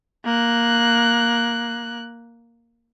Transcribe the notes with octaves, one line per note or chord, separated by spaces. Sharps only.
A#3 F#6